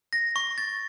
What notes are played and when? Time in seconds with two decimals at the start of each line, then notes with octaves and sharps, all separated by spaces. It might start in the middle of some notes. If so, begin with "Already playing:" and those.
0.13 A#6
0.36 C#6
0.58 A6